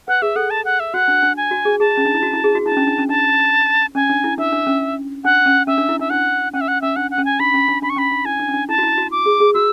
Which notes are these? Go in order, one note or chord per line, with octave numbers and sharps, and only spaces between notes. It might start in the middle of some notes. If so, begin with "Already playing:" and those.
B4 F#5
G#4 E5
A4 F#5
A5
F#5
E5
F#4 F#5
D4
D4
G#5
F#4
G#4
G#4 A5
C#4
D4
E4
F#4
E4
G#4
F#4
E4 A5
D4
C#4
D4
C#4
D4 A5
C#4 G#5
D4
E4
D4 E5
D4
C#4
D4 F#5
C#4
C#4 E5
D4
E4
D4 E5
D4 F#5
C#4 F#5
E5
F#5
C#4 E5
D4 F#5
F#5
C#4
G#5
D4 B5
C#4
D4
D4 B5
C#6
C#4 B5
D4
E4 G#5
D4
C#4
D4
E4 A5
F#4
E4
F#4
D6
G#4
G#4
F#4 E6